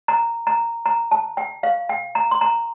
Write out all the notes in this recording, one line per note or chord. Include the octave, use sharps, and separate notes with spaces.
A#5
A#5
A#5
A5
G5
F5
G5
A#5
C6
A#5